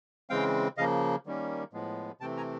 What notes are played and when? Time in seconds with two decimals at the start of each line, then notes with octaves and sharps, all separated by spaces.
0.30 C#3 E3 G#3 C4 F5 G5
0.77 C#3 F3 A#3 D#5 F5
1.26 D#3 G3 A#3 C#4
1.73 A2 F3 G#3 B3
2.20 C3 E3 A3 C4 G5 A5
2.37 G#5 A#5